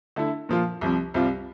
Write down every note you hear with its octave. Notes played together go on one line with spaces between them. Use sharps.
D3 A3 E4
A#2 F3 A#3 F4
C2 C3 F3 C4
C2 C3 G3 C4 F4